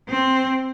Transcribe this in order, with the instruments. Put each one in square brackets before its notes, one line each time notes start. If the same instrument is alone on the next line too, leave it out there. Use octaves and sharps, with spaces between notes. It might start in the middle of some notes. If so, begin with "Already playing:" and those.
[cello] C4